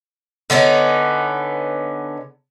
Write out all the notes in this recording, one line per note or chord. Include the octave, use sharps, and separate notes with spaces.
D3 B3 C#4 D#4